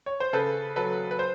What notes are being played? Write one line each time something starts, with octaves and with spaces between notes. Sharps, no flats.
C#5
C5
C#3 A4 B4
F#3 A4 B4
B4
C5